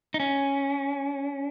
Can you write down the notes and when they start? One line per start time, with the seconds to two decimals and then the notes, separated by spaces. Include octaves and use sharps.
0.14 D#4
0.20 C#4